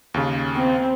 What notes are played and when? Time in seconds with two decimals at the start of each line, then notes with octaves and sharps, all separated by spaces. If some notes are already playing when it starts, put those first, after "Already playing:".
0.14 D#2 C#3
0.55 C4